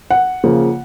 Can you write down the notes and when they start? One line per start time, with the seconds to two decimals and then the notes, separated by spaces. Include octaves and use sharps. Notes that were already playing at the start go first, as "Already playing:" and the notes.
0.11 F#5
0.44 C#3 F3 A#3